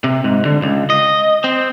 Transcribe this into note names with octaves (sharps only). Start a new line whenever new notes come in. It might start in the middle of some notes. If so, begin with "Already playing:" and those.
C3
G#2
D3
C#2
D#5
C4